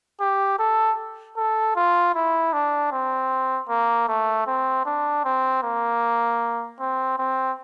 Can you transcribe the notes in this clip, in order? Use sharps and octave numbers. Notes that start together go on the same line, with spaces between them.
G4
A4
A4
F4
E4
D4
C4
A#3
A3
C4
D4
C4
A#3
C4
C4